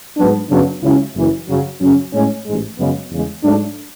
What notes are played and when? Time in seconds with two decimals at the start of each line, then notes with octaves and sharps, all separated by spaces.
0.17 G#2 F#3 B3 D4
0.50 F#2 C#3 F#3 B3 D4
0.82 C#2 C#3 F#3 C#4 E4
1.15 F#1 F#2 E3
1.48 F#2 C#3 F#3
1.80 F#2 C#3 F#3 C#4
2.13 A2 G#3 C#4
2.45 A1 G#2 G#3
2.78 F#2 C#3 G#3 B3
3.11 E2 C#3 G#3
3.44 G#2 F#3 A3 D4